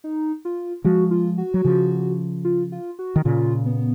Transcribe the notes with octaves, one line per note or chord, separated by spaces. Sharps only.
D#4
F4
F3 G#3 F#4
F4
F#4
F#3
C#3 F3
F4
F4
F#4
D#3
A#2 C#3 F4
B3